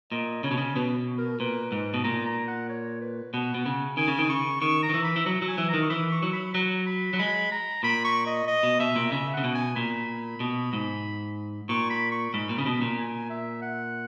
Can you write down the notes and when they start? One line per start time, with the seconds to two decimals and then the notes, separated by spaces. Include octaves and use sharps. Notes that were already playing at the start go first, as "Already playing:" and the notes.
0.12 A#2 D#5
0.44 C#3 C#5
0.51 B2
0.58 C#3
0.75 B2 B4
1.18 A#4
1.40 A#2 B4
1.72 G#2
1.94 B2
2.04 A#2 A#5
2.26 A#5
2.48 F#5
2.69 C#5
3.01 B4
3.33 B2 F#5
3.55 B2
3.66 C#3
3.97 D#3 G#5
4.08 C#3
4.19 D#3
4.29 C#3 C#6
4.62 D#3 C#6
4.83 A#5
4.89 D#3
4.94 E3
5.04 B5
5.16 E3
5.26 F#3 A#5
5.42 F#3
5.48 G#5
5.58 E3
5.69 D#3 A#5
5.83 C#6
5.90 E3 B5
6.12 C#6
6.23 F#3
6.33 B5
6.54 F#3 A#5
6.87 B5
7.13 F#3
7.19 G#3 B5
7.52 A#5
7.83 A#2 B5
8.05 C#6
8.27 D#5
8.48 D#5
8.63 B2
8.80 B2 E5
8.96 A#2
9.12 C#3 E5
9.34 C#3 F#5
9.44 B2
9.55 G#5
9.76 A#2 B5
10.40 B2
10.73 G#2
11.69 A#2 C#6
11.90 B5
12.12 C#6
12.33 G#2 B5
12.49 A#2
12.58 C#3
12.65 B2 B5
12.82 A#2
12.98 G#5
13.30 E5
13.62 F#5